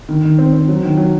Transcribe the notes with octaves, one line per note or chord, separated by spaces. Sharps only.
D#3
D#3
C4
C4
F#3
D#3
F#3